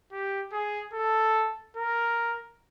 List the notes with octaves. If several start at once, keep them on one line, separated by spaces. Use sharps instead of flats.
G4
G#4
A4
A#4